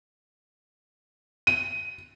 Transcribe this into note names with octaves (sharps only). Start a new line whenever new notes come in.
D#7